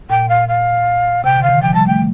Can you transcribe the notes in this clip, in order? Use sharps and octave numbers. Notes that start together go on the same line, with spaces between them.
A#2 G5
F5
F5
C3 G5
D3
F5
D#3
F3 G5
G3 A5
A3 G5